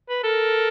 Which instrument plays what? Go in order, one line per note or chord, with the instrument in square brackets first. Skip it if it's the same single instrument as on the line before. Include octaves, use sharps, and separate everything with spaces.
[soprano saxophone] B4
[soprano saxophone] A4 [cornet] A#4